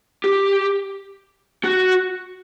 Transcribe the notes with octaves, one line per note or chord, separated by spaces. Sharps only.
G4
F#4